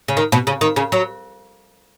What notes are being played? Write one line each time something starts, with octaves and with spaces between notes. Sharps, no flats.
C#3
D#3
B2
C#3
D#3
C#3
F#3